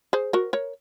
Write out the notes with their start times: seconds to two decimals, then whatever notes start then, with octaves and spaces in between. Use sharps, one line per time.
0.13 G#4 C5
0.33 F#4 A#4
0.53 A#4 C#5